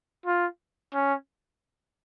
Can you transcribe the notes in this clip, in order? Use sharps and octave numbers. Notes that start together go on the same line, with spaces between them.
F4
C#4